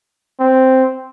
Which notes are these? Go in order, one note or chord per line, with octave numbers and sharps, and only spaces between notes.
C4